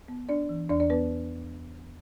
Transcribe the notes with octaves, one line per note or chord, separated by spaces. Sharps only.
B3
D4 D5
E3
E2 D4 D5
D4 D5
B3 B4